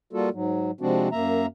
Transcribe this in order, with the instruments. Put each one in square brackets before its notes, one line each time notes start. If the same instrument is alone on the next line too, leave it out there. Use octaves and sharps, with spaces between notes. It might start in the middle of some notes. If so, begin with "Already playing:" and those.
[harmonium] G3 A#3 F4 F#4 A4
G#2 F#3
C3 F3 G#3 C4 D4 F#4
F#2 A#3 E5 A#5